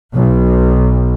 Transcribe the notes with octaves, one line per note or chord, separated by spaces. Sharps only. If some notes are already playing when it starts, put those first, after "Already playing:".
B1